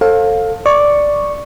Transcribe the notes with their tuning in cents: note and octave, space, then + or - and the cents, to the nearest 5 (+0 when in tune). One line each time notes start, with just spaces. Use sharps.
A4 +20 C5 +45 F5 +20
D5 +0 C#6 +0